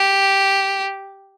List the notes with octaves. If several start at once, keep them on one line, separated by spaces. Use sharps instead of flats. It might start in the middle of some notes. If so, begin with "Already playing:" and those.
Already playing: G4